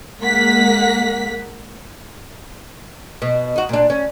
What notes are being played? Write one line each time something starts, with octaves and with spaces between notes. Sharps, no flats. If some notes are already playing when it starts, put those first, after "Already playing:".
G#3 A#3 F#5 B6
B2
D#4 F#4
A#2 D4
C#4